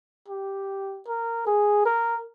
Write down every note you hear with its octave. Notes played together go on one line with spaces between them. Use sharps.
G4
A#4
G#4
A#4